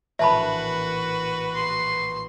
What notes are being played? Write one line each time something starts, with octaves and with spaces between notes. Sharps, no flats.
A#1 A2 E3 F#4 B4 E5 A5 B5
C6